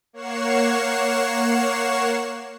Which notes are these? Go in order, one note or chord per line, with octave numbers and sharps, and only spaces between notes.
A#3 C#5 F#5 C#6 C7 E7